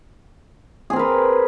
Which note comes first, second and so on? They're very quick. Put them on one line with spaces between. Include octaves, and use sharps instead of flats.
G#4 C4 A#4 B4